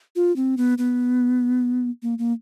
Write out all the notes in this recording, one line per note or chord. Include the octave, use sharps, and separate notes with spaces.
F4
C4
B3
B3
A#3
A#3